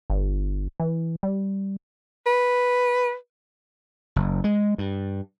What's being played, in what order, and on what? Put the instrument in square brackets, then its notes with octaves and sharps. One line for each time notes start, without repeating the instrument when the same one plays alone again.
[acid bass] G1
E3
G3
[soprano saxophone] B4
[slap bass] F#1
G#3
G2